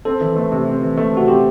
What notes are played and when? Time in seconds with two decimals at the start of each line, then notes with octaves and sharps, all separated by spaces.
0.05 C4 A4
0.21 E3
0.36 A3
0.52 C3
0.67 C4
0.82 E3
0.97 A3
1.13 C3 F#4
1.28 C4 G4